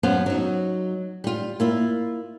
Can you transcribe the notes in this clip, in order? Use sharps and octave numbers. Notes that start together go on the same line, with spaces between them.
F#2 B3 C5 F5
F#3 D#4
G3 F4
A#3 E4 F4